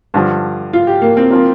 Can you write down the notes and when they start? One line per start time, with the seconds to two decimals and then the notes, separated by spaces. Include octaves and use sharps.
0.14 G2 D3 F3
0.73 F4
0.87 G4
1.02 A#3
1.17 C4
1.31 F3 C4 F4 A#4